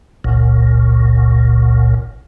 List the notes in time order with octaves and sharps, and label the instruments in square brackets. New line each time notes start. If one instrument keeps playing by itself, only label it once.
[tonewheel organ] F#1 C#2 A#2